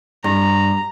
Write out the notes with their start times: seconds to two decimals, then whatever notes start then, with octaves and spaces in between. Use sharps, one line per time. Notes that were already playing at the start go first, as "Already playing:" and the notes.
0.24 G2 A#5